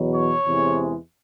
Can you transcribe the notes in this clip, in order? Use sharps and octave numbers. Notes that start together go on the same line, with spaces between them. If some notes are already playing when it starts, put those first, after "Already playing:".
Already playing: E2 B2 F#3
C#5
E2 C3 E3 G#3